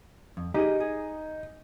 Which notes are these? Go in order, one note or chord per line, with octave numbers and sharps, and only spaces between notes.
F2
D#4 G4 G#4 D#5
G#4